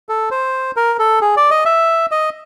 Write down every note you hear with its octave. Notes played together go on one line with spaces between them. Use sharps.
A4
C5
A#4
A4
G#4
D5
D#5
E5
D#5